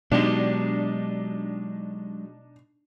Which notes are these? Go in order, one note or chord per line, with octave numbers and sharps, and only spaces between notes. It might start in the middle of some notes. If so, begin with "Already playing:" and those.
B2 F#3 G#3 D4 D#4 G4